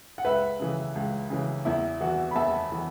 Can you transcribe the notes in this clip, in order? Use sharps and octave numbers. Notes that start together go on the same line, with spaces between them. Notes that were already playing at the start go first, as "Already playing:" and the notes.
F#5
C#2 B4 E5
C#3 E3
C#2
C#3 E3
E2 E4
E3 F#4
B5
E2 E5 A5
E3